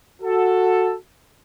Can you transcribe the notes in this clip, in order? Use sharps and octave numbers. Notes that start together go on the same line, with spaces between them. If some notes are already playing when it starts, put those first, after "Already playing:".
F#4 A4